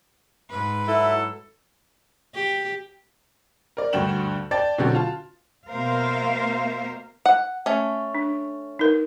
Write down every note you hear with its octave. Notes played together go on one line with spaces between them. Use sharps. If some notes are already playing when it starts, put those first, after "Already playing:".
G#2 B4
F#3 E4 A4
G4
A#4 D5
D2 G2 F#4 G5 E7 F#7
D5 G5 A5 A6
B2 D3 F#3 C4 F#4 G4
F4 A5
B2 A#3 A#4 C5 E5 F5
F#5
A3 C#4
D4
D#4 A#4 B4